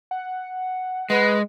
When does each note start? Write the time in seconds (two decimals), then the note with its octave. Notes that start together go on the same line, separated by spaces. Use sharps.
0.11 F#5
1.10 G#3 B4